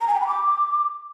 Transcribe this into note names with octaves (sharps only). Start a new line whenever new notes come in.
A#5
G#5
G5
B5
D6